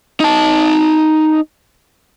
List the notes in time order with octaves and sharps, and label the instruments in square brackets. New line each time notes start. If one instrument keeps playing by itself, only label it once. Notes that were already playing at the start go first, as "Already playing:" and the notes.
[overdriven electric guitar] D#4 A5